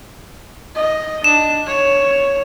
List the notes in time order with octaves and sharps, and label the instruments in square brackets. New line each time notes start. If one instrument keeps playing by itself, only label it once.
[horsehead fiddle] D#5
[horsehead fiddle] D4 [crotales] E7
[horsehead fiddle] C#5